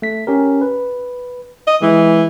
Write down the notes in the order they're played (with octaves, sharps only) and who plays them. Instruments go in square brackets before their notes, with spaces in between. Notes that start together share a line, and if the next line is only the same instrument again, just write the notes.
[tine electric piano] A3 B6
C#4 G4 A#4
B4
[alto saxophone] D#5
[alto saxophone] E3 [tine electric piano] G#3